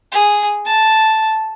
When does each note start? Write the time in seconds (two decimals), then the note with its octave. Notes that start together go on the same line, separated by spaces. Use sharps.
0.12 G#4
0.66 A5